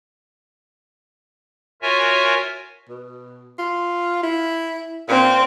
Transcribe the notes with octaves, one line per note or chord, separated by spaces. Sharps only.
F4 F#4 A#4 C#5 E5 G#5
B2
F4
E4
A#2 C4